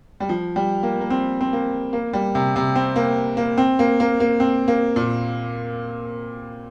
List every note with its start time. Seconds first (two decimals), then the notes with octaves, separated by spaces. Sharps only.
0.20 G3
0.29 F3
0.56 G3
0.83 A#3
1.01 A#3
1.10 C4
1.41 C4
1.53 A#3
1.93 A#3
2.13 G3
2.35 C3
2.56 C3
2.76 C4
2.96 A#3
3.37 A#3
3.58 C4
3.79 A#3
4.00 A#3
4.20 A#3
4.40 C4
4.68 A#3
4.96 A#2